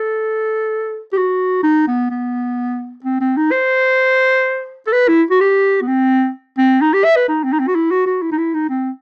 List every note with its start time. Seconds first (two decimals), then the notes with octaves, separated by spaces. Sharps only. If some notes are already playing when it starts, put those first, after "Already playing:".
Already playing: A4
1.13 G4
1.17 F#4
1.63 D#4
1.88 B3
2.11 B3
3.04 C4
3.21 C4
3.37 D#4
3.51 C5
4.87 A4
4.93 B4
5.08 E4
5.31 F#4
5.40 G4
5.81 B3
5.88 C4
6.58 C4
6.81 D#4
6.93 G4
7.04 E5
7.16 B4
7.28 D#4
7.44 C4
7.53 D#4
7.60 C4
7.68 F#4
7.75 E4
7.91 F#4
8.06 F#4
8.22 E4
8.32 D#4
8.38 E4
8.54 D#4
8.70 C4